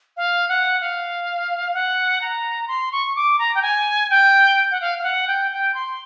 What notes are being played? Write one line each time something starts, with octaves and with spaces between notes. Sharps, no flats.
F5
F#5
F5
F#5
A#5
C6
C#6
D6
A#5
G5
G#5
G5
F#5
F5
F5
F#5
G5
G5
C6